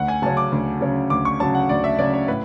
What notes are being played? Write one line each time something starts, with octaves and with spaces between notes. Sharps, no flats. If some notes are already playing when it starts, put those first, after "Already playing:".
Already playing: D2 F#5
G#5
C#3 F#3 C#4 A5
D6
D2
C#3 F#3 C#4
D2 D6
C#6
C#3 F#3 C#4 A5
F#5
D2 D5
E5
C#3 F#3 C#4 D5
C#5
A2 B4